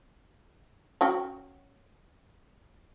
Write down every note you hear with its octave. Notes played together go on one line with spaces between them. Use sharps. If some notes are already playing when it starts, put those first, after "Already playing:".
C#4 F#4 G5